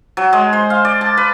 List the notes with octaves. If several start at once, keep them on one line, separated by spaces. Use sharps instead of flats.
F#3
G#3
C5
F5
D5
A5
B4